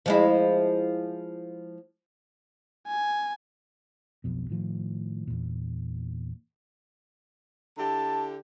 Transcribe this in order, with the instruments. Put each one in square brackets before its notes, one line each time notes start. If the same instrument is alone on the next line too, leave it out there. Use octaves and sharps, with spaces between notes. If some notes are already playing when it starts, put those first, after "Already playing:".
[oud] F3 G#3 E4
[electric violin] G#5
[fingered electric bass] B1 F2 B2
A2 D#3 F3
E2 A#2
[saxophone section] D3 E4 G4 [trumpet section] A5